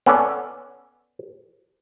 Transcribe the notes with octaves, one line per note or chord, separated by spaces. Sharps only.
B3 C#4 A4 D5